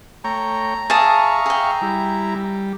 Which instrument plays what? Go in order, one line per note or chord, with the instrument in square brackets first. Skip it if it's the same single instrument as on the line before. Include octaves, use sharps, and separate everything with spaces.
[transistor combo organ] A3 C#5 G5 [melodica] A#5
[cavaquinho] G#4 A5 D#6 [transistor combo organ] E5 F5 C#6
[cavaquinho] G#4 G5
[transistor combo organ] G3 E4
G3